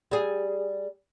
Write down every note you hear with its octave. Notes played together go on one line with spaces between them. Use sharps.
G3 G#4